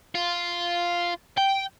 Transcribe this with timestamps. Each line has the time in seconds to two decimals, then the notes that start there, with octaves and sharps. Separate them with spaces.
0.15 F4
1.38 G5